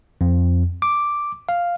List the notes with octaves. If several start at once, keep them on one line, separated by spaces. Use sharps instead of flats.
F2
D6
F5